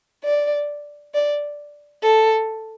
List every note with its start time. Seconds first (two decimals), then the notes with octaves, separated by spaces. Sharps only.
0.24 D5
1.14 D5
2.03 A4